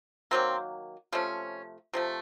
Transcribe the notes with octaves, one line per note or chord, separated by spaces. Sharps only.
D#3 F#3 A#3 C4
C3 F3 A3 C#4
C3 F3 A3